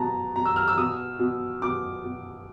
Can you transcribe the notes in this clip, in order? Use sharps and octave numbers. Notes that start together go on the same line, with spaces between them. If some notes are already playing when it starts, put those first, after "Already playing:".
Already playing: B2 A5 A#5
B2 A#5
E6
F6
E6
B2 D#6
B2
B2 D6
B2